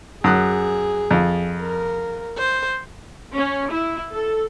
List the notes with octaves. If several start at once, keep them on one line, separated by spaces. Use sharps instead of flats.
F#2 G#4 D#6 F#6
F2
A#4
C5
C#4
E4
A4